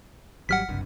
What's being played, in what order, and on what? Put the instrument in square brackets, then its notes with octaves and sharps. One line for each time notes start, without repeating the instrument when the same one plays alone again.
[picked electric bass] G#1 F#3 G3 [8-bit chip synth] F#5 F6 B6
[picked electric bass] F#1 C2 G2